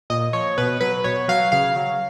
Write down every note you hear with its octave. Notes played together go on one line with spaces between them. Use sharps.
A#2 D#5
F3 C#5
B2 B4
F#3 B4
B2 C#5
F#3 F5
C#3 F5
F#3